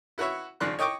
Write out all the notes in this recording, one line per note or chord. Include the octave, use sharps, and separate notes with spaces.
E4 F#4 B4 C#5 E5
G#1 C#2 F3 D4 C6 F#6
C#5 D#5 G5 C#6 D6